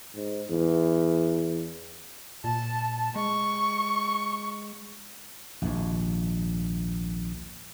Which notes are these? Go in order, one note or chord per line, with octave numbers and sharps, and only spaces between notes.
G#2
E2
A#2 A5
G#3 C#6
A#1 D#2 G#2